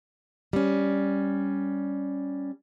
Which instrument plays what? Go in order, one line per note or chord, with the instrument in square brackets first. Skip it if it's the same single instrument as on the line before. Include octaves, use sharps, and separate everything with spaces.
[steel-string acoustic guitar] G3 C#4